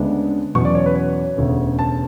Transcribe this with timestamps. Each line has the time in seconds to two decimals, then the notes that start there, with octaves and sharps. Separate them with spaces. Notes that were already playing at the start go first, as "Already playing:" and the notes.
Already playing: D2 C#3 G#3 B3 D4
0.55 E2 B2 F#3 C#4 C#6
0.65 D5
0.75 C#5
0.86 B4
0.95 C#5
1.37 E1 D2 C#3
1.79 A5